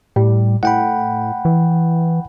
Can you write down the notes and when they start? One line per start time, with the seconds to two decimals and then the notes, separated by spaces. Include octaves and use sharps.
0.16 A2 G3
0.63 A2 F#5 G5 B5
1.45 E3